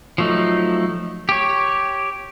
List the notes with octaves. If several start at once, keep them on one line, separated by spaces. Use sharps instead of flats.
F3 F#3 A3 D#4
G4 C#5